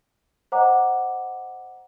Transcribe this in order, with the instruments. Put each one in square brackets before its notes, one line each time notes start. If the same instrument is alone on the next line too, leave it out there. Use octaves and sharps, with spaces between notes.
[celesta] C5 D#5 F#5 A#5 D6